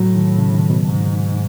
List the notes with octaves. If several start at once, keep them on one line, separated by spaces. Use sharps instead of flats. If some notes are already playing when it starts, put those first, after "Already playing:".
Already playing: A2 F#3
D#3
C#3
D#3
B2
G#2